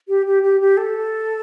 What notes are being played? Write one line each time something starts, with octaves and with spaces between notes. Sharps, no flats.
G4
G4
G4
G4
A4